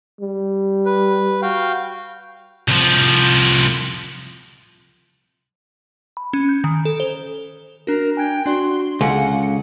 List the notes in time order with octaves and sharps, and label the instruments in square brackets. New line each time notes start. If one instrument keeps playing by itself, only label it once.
[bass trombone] G3
[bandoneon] B4
F#4 F5 G5
[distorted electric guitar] C2 F3
[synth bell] B5
C#4
G6
D#3
A4
C5
[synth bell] D4 F#4 [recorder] A#4
[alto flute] D4 [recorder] G5 [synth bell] G#5 F#6 G#6
[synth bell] D4 D5 [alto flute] F#4 [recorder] C6
[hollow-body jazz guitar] C#2 [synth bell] G#4 A4 [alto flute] F5 [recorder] F#5